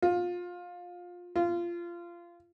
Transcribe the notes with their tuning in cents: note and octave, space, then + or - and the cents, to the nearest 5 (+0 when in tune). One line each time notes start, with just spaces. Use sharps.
F4 +20
F4 -20